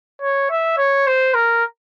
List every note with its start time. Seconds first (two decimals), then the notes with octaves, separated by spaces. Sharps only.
0.22 C#5
0.50 E5
0.78 C#5
1.07 C5
1.34 A#4